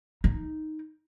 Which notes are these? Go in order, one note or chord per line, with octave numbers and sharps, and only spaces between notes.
D#4